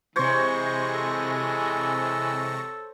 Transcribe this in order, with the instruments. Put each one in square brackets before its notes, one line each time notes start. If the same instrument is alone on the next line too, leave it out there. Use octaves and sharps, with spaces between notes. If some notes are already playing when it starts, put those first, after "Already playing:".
[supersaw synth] C3 C#6 A#6 [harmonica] E3 G#3 [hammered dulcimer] C5 C#5
[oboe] A4